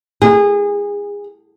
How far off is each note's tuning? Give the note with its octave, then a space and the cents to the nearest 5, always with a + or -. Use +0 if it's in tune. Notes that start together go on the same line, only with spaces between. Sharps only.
G#4 -25